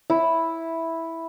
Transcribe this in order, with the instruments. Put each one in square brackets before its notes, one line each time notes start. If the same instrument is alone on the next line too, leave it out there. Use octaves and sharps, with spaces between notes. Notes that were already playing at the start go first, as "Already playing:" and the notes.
[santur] E4